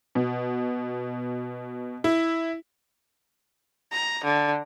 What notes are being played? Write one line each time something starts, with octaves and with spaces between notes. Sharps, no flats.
B2
E4
A#5
D3